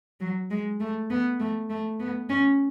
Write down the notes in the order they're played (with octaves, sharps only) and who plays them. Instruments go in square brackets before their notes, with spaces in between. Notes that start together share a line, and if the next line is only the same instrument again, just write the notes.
[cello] F#3
G#3
A3
B3
A3
A3
B3
C#4